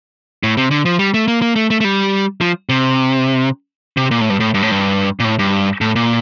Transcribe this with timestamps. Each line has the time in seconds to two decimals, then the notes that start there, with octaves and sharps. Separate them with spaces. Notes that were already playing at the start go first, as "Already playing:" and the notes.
0.43 A2
0.57 C3
0.71 D3
0.85 F3
0.99 G3
1.14 A3
1.28 A#3
1.42 A#3
1.56 A3
1.70 A3
1.81 A3
1.84 G3
2.41 F3
2.69 C3
3.97 C3
4.11 A#2
4.21 A2
4.30 G2
4.40 A2
4.54 G2
4.62 A2
4.71 G2
5.20 A#2
5.24 A2
5.39 G2
5.81 A2
5.96 A#2